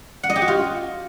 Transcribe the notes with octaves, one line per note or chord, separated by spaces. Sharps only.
F#5
D#5
G4
F#4
F4